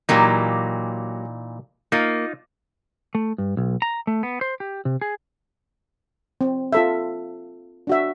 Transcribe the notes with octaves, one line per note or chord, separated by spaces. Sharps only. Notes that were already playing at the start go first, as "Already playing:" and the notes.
A#2 E3 F#3 A#3 D#4 G4
A#3 D#4 F4
A3
G2
B1
A#5
A3
B3
C5
G4
C3
G#4
C4
F4 A4 E5
D4 F#4 E5